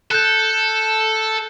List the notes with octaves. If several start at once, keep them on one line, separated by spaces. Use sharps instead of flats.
A4 F#6 G6